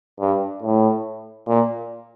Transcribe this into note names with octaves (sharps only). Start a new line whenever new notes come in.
G2
A2
A#2